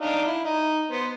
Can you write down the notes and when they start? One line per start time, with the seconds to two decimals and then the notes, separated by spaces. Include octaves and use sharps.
0.01 D4 D#4 F5
0.26 E4
0.45 D#4
0.91 B3 C5